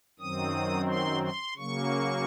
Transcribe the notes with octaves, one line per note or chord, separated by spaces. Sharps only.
F#2 D#3 F#3 C4 D#6
C6
C6
C#3 F#3 A#3 C#6